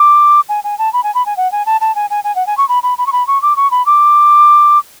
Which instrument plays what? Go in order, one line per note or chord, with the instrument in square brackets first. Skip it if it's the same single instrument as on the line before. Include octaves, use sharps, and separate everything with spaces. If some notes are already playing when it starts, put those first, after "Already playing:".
Already playing: [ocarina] D6
G#5
G#5
A5
B5
G#5
B5
G#5
F#5
G#5
A5
A5
G#5
G#5
G#5
F#5
G#5
C#6
B5
B5
B5
C#6
B5
C#6
D6
C#6
B5
D6